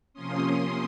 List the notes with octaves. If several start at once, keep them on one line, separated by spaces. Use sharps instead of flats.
C3 F3 A#3 C#4 C6 D#6